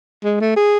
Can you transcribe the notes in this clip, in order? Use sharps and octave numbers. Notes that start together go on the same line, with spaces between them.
G#3
A3
G#4